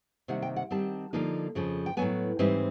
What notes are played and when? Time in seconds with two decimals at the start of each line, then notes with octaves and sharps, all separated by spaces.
0.28 C3 D#3 G3 A#3 F#5
0.42 G5
0.56 F#5
0.71 D#3 G3 C4 A5
1.13 D3 F3 A#3 D#4
1.55 F2 C#3 F3
1.86 G5
1.97 A2 F#3 B3 G#5
2.39 G#2 E3 G3 C4 D#4 D#5